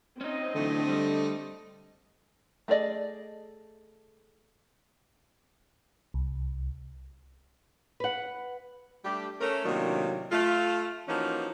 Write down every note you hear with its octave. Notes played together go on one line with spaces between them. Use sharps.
C4 C#4 D#4 D#5
A2 D3 E3 F#3 A3
G3
A3 G#4 A4 D5 D#5
C2
B4 F#5
G3 A3 D4 G4
A3 C#4 A#4
A2 C3 D#3 F#3 A#3 D4
A3 F4
E3 F3 A#3 C#4 D#4 F#4